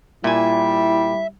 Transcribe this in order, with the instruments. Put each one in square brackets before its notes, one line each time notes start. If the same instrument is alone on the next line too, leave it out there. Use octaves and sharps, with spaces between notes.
[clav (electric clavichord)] A#2 G#5 [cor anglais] G3 [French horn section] E4 [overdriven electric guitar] E5